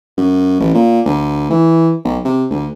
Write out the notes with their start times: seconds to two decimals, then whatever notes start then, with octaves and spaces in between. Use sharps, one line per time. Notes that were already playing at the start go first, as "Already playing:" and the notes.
0.17 F#2
0.60 A1
0.74 A#2
1.06 D2
1.50 E3
2.04 B1
2.25 C3
2.50 D2